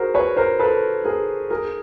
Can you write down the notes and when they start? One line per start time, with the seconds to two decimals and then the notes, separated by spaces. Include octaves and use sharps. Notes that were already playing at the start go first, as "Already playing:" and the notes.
Already playing: F#4 G#4 A#4 C5
0.14 B4 C#5
0.37 A#4 C5
0.60 A4 B4
1.04 G#4 A#4
1.50 G#4 A#4